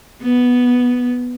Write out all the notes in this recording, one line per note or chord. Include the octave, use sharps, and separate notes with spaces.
B3